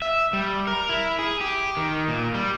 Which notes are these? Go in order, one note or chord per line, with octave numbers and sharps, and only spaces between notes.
E5
G3
A#4
E4
G#4
G4
D#3
A#2
G3